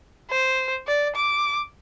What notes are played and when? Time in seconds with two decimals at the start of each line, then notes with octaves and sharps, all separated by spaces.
0.30 C5
0.87 D5
1.16 D6